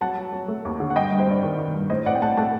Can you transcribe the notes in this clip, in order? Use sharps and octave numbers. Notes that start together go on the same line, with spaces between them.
F#3 F#5 A5
F#3
F#3
A3
D#2
D3
F#5
G2 D#5 G5
G2
C5 D#5
G2 D5
D#3
D#3
G2
A2 C5 D#5
A2 D5 F#5
G5
A2 F#5 A5
A3 F#5 A5